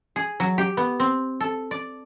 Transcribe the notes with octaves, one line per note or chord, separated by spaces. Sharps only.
G#4
F#3
G4
B3
C4
A4
D5